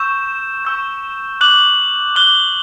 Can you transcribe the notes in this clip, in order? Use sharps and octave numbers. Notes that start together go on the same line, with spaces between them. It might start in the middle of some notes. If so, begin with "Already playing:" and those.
Already playing: C#6 E6 G6 E7
C#6 E6 G6
D6 F#6 F#7
D6 F#6 G7